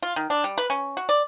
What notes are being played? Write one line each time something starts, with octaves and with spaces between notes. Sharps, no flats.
F4
D#3
D4
G3
B4
C#4
F#4
D5